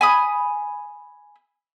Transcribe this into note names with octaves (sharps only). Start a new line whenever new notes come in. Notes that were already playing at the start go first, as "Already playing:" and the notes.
G#5 B5 D#6